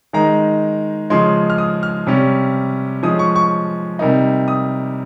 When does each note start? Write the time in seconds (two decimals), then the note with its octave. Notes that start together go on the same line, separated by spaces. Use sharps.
0.13 D#3 G#3 D#4 A#5
1.10 C#3 F3 G#3 C6
1.50 F6
1.58 D#6
1.83 F6
2.07 C3 G3 C#4
3.03 F3 G#3 C#4 D#6
3.19 C#6
3.36 C#6
3.99 C3 G3 A#3 D#4
4.48 D#6